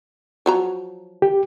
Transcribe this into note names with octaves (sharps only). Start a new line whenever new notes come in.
F3 F#3 A#5
G4